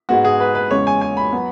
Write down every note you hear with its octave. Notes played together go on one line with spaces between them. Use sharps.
G#2 G#3 B3 F#4
G#4
B4
B4
E2 C#3 G#3 C#4 C#5
G#5
G#5
B5
F#3 B3